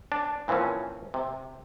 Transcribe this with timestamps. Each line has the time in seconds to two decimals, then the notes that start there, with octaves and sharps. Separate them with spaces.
0.12 D4
0.48 A#2 E3 F3 C4 C#4
1.14 C3